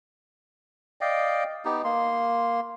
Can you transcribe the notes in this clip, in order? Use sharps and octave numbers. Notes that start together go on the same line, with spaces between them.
D5 D#5 F5 G5
B3 D#4 G4
A#3 C6